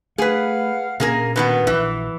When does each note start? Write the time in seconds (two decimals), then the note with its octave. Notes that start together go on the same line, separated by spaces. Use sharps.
0.18 A3 G#4 B4 F5 F#5
1.00 A#2 A#3 C#4 G#4 A#4
1.36 B2 D#3 B3 B4
1.67 A#1 E3